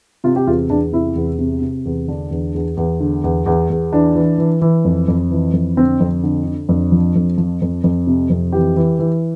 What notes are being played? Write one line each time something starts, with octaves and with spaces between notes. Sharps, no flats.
C3 F4
G4
E2 F4
E2 D4
C3 E4
E2
C3
C3
E2
D3 D4
E2
E2
E2
D3
E2
E2
E2
E3 D4
E3
E3
E3
F2
F2
E3
F2
D3 C4
F2
D3
D3
F2 D4
F3
F2
F3
F2
F2
C3
F2
E3 G4
E3
E3